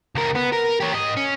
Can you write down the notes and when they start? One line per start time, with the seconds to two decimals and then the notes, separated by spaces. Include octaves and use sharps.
0.16 C#2 A#4
0.35 B3 B4
0.52 A#4
0.80 G4 C#5
0.94 G#2 D#5
1.17 C#4